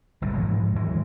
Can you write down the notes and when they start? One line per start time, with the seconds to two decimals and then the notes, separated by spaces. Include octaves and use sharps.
0.22 G1 C2 A#2 G3
0.34 G#2 E3 F3 G#3
0.75 D#2 E3 F#3 G#3